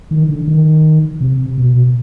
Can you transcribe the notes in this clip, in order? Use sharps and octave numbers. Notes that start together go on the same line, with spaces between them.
D#3
D3
D#3
C3
B2